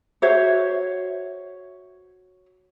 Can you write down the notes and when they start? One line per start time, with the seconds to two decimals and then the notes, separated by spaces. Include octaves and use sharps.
0.22 F#4 C5 C#5 E5